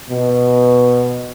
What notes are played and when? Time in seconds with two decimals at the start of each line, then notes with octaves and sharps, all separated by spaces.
0.10 B2